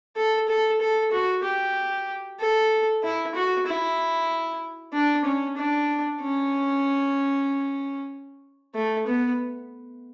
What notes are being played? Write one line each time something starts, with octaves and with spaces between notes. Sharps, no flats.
A4
A4
A4
F#4
G4
A4
E4
F#4
E4
D4
C#4
D4
C#4
A3
B3